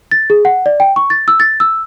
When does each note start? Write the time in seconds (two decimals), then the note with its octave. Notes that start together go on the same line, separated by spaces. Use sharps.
0.11 A6
0.30 G#4
0.45 F#5
0.66 D5
0.80 G5
0.96 C#6
1.10 A6
1.28 E6
1.40 A6
1.60 E6